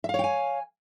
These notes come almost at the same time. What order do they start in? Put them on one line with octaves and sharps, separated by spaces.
E5 F5 C#5 G5 G#5